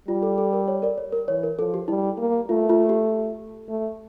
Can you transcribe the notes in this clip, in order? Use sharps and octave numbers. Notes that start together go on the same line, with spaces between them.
G3 F4
A4
A4
A#4
C#5
A#4 D5
C#5
A#4
E3 C#5
A#4
F3 A4
G4
G3 E4
A#3
A3 F4
F4
G4
A3